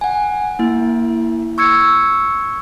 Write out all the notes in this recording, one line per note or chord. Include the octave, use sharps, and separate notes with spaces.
F#5 G#5
A#3 E4
C#6 E6 G#6 C#7